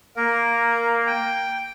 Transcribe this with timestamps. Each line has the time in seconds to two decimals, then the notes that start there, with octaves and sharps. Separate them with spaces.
0.16 A#3 A#4
1.07 G5